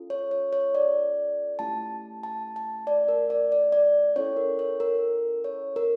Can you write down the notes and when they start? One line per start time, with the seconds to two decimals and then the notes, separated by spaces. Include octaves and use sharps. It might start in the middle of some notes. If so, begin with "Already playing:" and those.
Already playing: C#4 F4 A4
0.10 C#5
0.31 C#5
0.53 C#5
0.75 D5
1.59 A3 C#4 E4 G4 A5
2.23 A5
2.56 A5
2.87 D5
3.08 A#4
3.30 D5
3.52 D5
3.72 D5
4.16 C#4 E4 A4 C#5
4.37 A#4
4.59 C#5
4.80 A#4
5.44 C#5
5.76 A#4